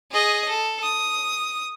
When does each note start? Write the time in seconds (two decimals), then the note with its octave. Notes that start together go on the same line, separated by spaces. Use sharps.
0.12 G#4 D#5
0.49 A4
0.83 D#6